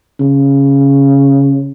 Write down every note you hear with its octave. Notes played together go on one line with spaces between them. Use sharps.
C#3